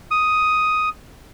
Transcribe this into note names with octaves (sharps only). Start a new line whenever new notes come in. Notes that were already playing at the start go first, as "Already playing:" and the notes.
D#6